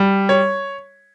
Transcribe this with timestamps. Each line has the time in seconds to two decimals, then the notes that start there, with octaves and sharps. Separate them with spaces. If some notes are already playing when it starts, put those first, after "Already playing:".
Already playing: G3
0.29 C#5